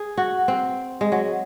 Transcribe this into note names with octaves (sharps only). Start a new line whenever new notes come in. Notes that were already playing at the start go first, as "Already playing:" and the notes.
Already playing: G#4
F#4
C4
G#3
F#3